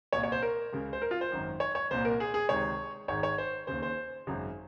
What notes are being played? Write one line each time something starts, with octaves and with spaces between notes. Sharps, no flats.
C2 A#2 C#5
C#5
C5
A#4
C#2 C#3
C5
A#4
F4
C5
G#1 F#2 D#3
C#5
C#5
C2 A#2 C5
A#4
G#4
G#4
C#2 C3 D#3 C#5
G#1 G#2 D#3 C#5
C#5
C5
D#2 C#3 C5
C5
G#1 F#2 C#3